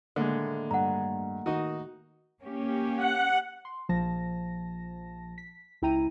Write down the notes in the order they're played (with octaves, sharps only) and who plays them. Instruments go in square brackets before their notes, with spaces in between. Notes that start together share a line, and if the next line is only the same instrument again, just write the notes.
[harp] A2 D#3 A#3 [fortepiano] D3 G#3
[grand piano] G2 [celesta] F#5 A#5
[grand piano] D#3 [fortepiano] D#4 F#4 [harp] D#6
[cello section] A#3 C#4 G4
[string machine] F#5
[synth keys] C6
A#1 F3 A5 A#6
B6
C#2 E4 G5 A#5 D#7